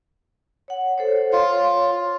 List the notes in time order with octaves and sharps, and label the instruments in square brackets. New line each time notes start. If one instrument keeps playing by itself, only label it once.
[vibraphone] C#5 F#5
A4 C5 C#5
[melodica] F4 [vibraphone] C#5 F5